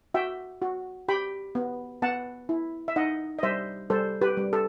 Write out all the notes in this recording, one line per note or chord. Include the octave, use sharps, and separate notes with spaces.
F#4 E5 G5
F#4
G4 G5 B5
B3
B3 F#5 A5
E4
E5
D#4 D#5 F#5
D#5
G3 C5 E5
G3 A4 C5
G4 B4
G3
A4